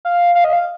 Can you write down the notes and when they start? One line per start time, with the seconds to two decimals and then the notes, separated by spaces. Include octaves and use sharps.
0.05 F5
0.35 F5
0.44 D#5
0.53 F5